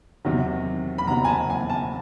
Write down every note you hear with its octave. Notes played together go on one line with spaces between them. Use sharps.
E2 C3 D#3 F#3
B5
E2 C3 D#3 F#3 A#5
G#5
A5
G#5
A5